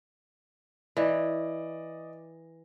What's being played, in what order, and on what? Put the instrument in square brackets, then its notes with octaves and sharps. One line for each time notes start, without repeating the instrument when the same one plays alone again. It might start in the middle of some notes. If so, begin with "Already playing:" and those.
[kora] E3 [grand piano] D5 D#5